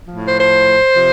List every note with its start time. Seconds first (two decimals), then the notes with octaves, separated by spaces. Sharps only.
0.06 A2 F3
0.27 C5
0.39 C5
0.95 C3 F3